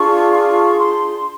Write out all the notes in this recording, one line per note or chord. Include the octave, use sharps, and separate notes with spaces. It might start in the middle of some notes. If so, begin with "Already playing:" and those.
Already playing: D4 F4 G#4 C#6
C#6
C6